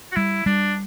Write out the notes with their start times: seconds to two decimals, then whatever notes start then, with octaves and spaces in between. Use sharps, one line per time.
0.12 F#4
0.16 G3 E4
0.46 G3 D4